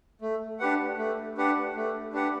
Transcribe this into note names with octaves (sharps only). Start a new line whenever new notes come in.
A3
D4 G4 B4 F#5
A3
D4 G4 B4 F#5
A3
D4 G4 B4 F#5